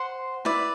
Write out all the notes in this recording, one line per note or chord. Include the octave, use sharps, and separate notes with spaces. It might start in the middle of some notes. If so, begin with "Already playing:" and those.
Already playing: C5 F#5 C6
E4 B4 D5